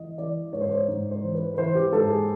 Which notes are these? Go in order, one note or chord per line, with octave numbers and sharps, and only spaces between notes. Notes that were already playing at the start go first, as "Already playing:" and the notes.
Already playing: E3 D#5
E3 D5
G#2 C#5
C5
C#5
G#2
C5
E3
B4
B4
E3 C5
G4
G#2 A4
G#4